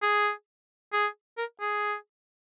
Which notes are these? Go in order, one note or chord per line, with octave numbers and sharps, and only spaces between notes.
G#4
G#4
A#4
G#4